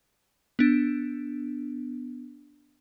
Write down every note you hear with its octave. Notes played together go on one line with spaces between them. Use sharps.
B3 D4